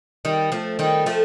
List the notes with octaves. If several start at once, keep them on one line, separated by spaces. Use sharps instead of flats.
D#3 G3
F3 A3
D#3 G3
F3 A3